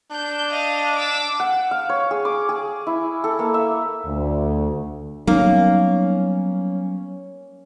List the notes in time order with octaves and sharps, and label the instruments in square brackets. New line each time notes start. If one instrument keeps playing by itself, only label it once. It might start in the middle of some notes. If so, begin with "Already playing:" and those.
[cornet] D4 [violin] G6
[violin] D#5 F5
D6 E6
[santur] F#5
F5
C#5
G#4
D6
G#4
E4
A4
A#3
E5
[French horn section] D2
[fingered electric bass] F#3 G3 B3 [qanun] A#3 [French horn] C#4 [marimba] D#4